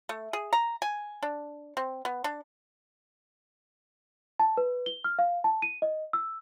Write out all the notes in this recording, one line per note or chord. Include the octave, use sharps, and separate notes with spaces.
A3
G#4
A#5
G#5
D4
C4
B3
D4
A5
B4
G7
F6
F5
A5
D#7
D#5
E6